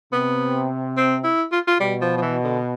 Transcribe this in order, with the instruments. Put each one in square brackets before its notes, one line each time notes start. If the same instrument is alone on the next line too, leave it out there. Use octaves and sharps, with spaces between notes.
[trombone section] C3 [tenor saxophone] B3
[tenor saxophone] C4
E4
F4
F4
[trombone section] B2 [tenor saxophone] G3
[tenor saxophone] F3
F3
E3
D3